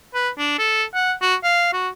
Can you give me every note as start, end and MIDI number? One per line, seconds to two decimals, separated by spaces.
0.14 0.29 71
0.38 0.55 62
0.59 0.84 69
0.94 1.13 78
1.21 1.35 66
1.44 1.68 77
1.73 1.89 66